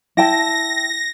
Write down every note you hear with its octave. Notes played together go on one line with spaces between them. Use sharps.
E4 G5 A5 A#6